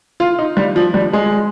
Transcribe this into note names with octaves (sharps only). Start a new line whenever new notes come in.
F4
D#4
G3
F3
G3
G#3